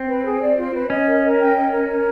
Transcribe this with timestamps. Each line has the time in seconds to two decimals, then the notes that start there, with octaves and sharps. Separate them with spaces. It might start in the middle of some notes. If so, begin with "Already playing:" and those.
Already playing: C4
0.08 B4
0.24 G#4
0.41 D5
0.57 F4
0.74 B4
0.90 C#4 D#5
1.07 A#4
1.23 A#4
1.39 G5
1.56 D#5
1.72 A#4
1.88 A#4